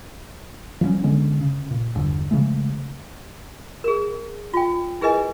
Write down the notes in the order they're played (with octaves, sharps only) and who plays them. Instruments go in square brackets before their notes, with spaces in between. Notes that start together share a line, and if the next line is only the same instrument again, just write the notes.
[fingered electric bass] F3 G3 B3 C#4
D3 G#3 B3 C#4
C#3
A#2
G1 E2 D3
C#3 F3 G#3 A3
[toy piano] G#4 A#4
F4 G5
E4 G#4 A#4 B4 D#5 G#5